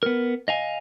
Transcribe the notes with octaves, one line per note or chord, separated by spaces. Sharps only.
B3 A#4
D#5 F5 G#5